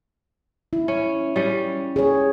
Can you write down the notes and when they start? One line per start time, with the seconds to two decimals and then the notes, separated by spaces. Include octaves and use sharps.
0.73 E4
0.88 C#4
1.36 G3 C#4
1.96 G#4 C#5